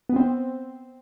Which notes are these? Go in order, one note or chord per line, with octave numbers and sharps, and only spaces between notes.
B3
C4